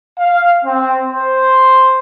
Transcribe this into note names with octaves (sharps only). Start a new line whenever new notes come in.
F5
C4
C5